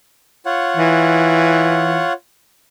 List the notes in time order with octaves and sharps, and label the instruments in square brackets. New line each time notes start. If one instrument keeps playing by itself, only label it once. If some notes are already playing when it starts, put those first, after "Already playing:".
[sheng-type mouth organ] F4 C#5 F#5
[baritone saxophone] E3